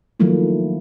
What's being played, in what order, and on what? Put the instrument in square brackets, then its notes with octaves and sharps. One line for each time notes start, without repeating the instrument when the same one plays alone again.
[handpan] D#3 F3 F#3 A3 A#3 E4